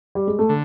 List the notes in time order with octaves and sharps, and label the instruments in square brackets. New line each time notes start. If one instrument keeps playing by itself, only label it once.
[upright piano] G3
G#3
A3
[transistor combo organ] D3